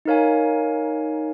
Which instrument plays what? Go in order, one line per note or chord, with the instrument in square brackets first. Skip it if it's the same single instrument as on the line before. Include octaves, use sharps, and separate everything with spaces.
[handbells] D#4 A#4 C#5 F5 G#5